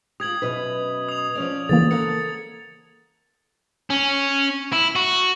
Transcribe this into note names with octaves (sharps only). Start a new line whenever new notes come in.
F4 G4 D#6 G#6 F#7
F#2 B2 B4
D#6 F7
F3 C#4 D5
C#3 E3 A#3 A6
A4 A#4 F#5 C#7
C#4
E4
F#4